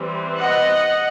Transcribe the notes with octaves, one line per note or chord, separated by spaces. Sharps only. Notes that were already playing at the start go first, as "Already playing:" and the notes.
Already playing: E3 G3 C4
D#5 F#5